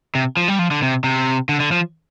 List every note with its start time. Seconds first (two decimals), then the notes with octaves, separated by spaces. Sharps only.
0.15 C3
0.37 F3
0.48 G3
0.59 F3
0.71 D3
0.82 C3
1.04 C3
1.49 D3
1.60 D3
1.72 F3